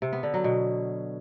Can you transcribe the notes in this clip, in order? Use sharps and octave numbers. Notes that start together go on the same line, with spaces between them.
C3
B3
D3
F#3
B2